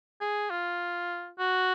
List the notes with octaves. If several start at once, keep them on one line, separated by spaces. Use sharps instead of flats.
G#4
F4
F#4